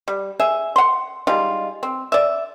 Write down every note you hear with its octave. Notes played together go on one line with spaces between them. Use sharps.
G3
G#4 E5
F#5 C6
G3 G#3 D#4 F4
C4
D5 E5